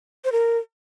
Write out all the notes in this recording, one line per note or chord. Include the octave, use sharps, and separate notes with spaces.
C5
A#4